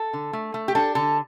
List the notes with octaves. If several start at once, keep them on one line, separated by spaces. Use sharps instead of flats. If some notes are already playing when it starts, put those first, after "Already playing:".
Already playing: A4
D3
A3
A3
G4
D4 A4
D3 A4